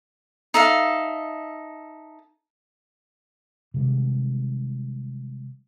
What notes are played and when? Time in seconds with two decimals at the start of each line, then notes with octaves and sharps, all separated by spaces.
0.54 D#4 A4 E5 F5
3.74 C3 D#3 G3 G#3